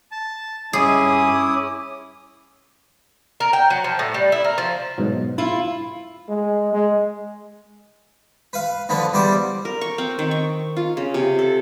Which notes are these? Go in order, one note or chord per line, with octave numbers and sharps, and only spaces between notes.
A5
G2 C#4 E4 G#4 G#5 D6 D#6
A#4
G5
F#3
F3
A2
G3
E4
A#4
F3
G#2 B2 F#3
E4 F4
G#3
G#3
B4 F5
D3 F3 B3 B4
E2 G3 C5 D5
A#4
C#6
C4
D#3
C#6
F4
C#3
C3
A4